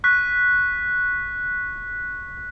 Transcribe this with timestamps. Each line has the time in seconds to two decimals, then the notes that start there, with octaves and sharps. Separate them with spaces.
0.04 C#6 F#6 B6